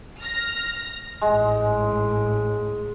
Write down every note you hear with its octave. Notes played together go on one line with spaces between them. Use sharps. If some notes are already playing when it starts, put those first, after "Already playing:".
F6 A#6
A1 G#2 G#3